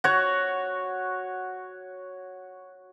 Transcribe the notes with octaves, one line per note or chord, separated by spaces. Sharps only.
F#4 C#5